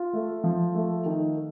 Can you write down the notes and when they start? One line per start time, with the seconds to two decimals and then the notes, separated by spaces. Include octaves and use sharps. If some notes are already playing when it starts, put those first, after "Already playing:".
Already playing: F4
0.13 A3
0.44 F3
0.75 A3
1.06 D#3